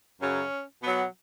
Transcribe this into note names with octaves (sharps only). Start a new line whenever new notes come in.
F#2 C#3 F#3 C#4
B2 F#3 B3